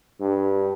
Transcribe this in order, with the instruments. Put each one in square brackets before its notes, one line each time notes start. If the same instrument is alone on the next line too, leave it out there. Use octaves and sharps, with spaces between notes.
[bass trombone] G2